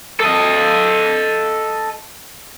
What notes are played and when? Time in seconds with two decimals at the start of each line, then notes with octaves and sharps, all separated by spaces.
0.20 A4 D#5